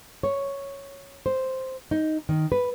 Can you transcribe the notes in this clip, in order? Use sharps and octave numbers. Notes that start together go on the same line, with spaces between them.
C#5
C5
D#4
D#3
B4